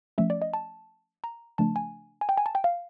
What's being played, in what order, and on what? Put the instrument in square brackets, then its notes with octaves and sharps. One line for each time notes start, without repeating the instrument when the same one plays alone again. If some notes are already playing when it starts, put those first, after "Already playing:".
[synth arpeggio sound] F3 A3 C#4 E5
D5
D#5
A5
A#5
C#3 F3 A3 D4 A5
G#5
G#5
G5
G#5
A5
G5
F5